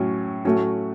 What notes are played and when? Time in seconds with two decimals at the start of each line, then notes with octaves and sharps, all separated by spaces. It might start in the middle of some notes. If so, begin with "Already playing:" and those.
Already playing: A2 F#3 C#4
0.45 A2 F#3 A3 C#4 F#4